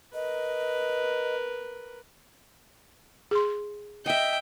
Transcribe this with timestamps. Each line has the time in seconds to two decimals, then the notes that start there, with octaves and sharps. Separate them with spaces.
0.14 A#4 B4 D#5
3.31 G#4 C6
4.06 D#5 E5 G5